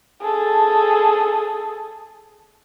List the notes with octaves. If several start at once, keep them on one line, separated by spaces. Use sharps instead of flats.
G#4 A4